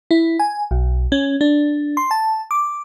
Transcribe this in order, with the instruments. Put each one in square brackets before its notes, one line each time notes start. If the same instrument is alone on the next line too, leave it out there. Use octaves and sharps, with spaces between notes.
[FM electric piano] E4
G#5
B1
C#4
D4
C6
A5
D6